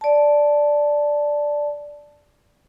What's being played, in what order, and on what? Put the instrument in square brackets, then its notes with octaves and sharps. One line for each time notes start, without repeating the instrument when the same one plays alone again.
[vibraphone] D5 A5